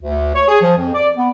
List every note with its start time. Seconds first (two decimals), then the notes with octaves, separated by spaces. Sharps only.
0.03 D2
0.34 C#5
0.48 G#4
0.61 F3
0.76 F2
0.94 D5
1.16 B3